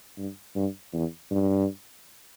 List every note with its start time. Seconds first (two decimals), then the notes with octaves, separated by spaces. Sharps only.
0.18 G2
0.56 G2
0.93 E2
1.31 G2